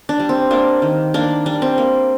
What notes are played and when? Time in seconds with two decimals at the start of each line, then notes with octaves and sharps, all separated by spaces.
0.09 D4
0.19 G3
0.29 C4
0.51 A#3 D4
0.82 D#3
1.14 A#3 D4
1.46 G3 D4
1.62 C4
1.78 A#3